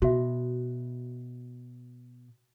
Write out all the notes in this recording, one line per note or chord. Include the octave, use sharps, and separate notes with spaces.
B2 F#4 E5